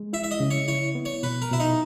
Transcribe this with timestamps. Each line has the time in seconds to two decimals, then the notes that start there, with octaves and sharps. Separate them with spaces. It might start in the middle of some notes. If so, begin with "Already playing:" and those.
Already playing: G#3
0.13 E4 E5
0.24 E5
0.31 D#5
0.40 C#3
0.50 C#5
0.68 E4 C#5
0.95 B3
1.05 C#5
1.23 B2 B4
1.42 A#4
1.51 B2 E4
1.60 D#4